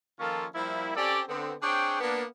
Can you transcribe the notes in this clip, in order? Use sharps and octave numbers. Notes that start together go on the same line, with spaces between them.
D#3 F3 A#3 C#4 F4 A4
F3 G3 A#3 E4
C4 C#4 G4 A4 D5
D3 B3 C4
C4 D4 G#4 C#5 G5
A#3 B3 D4